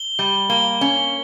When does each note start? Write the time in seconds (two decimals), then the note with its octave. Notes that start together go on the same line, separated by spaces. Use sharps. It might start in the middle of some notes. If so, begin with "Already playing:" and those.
Already playing: G7
0.19 G3
0.50 A#3 G7
0.81 C#4